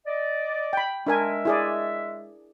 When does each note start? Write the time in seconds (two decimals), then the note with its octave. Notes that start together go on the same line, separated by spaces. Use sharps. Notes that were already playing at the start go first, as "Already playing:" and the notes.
0.06 D5 D#5
0.73 G5 B5
1.07 G#3 D4 A#4 E5 G#5
1.45 E4 G#4 D5